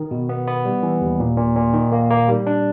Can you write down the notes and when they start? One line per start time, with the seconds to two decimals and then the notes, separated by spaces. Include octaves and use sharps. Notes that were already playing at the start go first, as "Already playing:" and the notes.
Already playing: D#3
0.11 B2
0.29 B3
0.47 B3
0.65 G3
0.83 E3
1.01 D#2
1.20 A#2
1.37 A#2
1.55 A#2
1.73 D#3
1.92 A#3
2.11 A#3
2.28 G3
2.47 D4